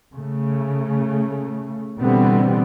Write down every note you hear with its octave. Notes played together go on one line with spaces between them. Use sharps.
C#3 A3
B2 D3 E3 G3 B3 C4